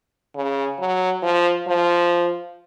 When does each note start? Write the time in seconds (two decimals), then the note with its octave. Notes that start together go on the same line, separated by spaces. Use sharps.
0.35 C#3
0.79 F#3
1.23 F3
1.68 F3